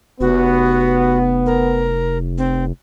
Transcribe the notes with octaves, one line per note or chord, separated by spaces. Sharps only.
F1 B3 F#4
A#4
C4